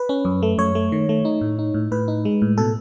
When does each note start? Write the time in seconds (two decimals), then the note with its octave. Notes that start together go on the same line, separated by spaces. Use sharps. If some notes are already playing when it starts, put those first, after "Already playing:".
Already playing: B4
0.09 C#4
0.25 F#2
0.43 A3
0.58 F#2 C#5
0.75 A3
0.92 D#3
1.09 A3
1.25 D#4
1.41 A2
1.59 D#4
1.74 A2
1.92 A2 B4
2.08 D#4
2.25 G#3
2.42 A2
2.58 B2 A4